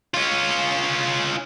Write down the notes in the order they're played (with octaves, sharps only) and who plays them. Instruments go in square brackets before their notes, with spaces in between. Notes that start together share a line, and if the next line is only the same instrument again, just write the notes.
[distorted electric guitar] C#4 F4